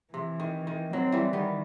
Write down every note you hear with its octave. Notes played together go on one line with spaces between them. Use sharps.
C3 E3
D#3
D#3
F#3 C4
E3 G3
D#3 G3 B3